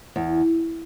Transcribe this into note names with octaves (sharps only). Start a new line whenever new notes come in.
E2